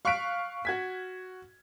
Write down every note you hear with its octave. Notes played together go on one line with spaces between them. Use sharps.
F5 C#6 F6 F#6 B6 D7
F#4 G#6 B6